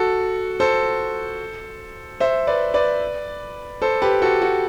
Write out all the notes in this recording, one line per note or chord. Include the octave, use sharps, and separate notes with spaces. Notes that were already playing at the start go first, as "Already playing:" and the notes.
Already playing: F#4 A4
A4 C5
C5 E5
B4 D5
B4 D5
A4 C5
G4 B4
F#4 A4
F#4